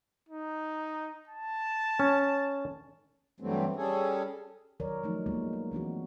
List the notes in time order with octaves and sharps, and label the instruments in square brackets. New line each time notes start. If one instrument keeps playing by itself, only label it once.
[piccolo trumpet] D#4
A5
[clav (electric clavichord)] C#4
[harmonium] G2 E3 F#3 G3 A3 C4
G3 C#4 G#4 A4
[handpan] D#3 F#3 A#4 C#5 D5
D#3 F3 F#3 A3 D#4
G#3 A#3 B3 D#4 F4
G#3
E3 C4 D4 F#4